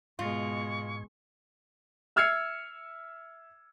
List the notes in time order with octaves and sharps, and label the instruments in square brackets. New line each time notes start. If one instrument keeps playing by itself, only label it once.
[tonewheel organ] G#2 [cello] B2 G#3 [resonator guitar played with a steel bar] F4 [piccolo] C#6
[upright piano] E5 E6 F6 G#6 C7 C#7